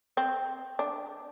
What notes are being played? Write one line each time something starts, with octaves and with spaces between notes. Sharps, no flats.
C4
D4